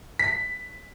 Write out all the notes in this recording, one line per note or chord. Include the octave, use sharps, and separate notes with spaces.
B6